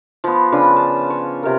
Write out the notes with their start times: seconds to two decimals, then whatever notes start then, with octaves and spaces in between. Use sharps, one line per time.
0.24 F3 B3
0.52 C#3 D4 F4 B4
0.76 A5
1.10 C#5
1.43 C3 A#4